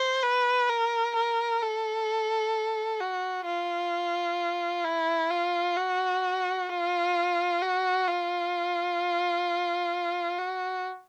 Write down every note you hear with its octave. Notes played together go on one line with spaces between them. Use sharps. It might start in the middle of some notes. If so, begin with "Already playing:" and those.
Already playing: C5
B4
A#4
A#4
A4
F#4
F4
E4
F4
F#4
F4
F#4
F4
F#4